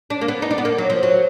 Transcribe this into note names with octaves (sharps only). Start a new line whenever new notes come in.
D4
A#3
B3
D#4
D4
B3
A#3
F#3
F3
F#3